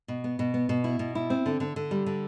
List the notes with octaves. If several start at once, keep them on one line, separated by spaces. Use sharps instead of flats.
B2
B3
B2
B3
B2
E4
B2
E4
C4
D3
D3
D3
G3
D3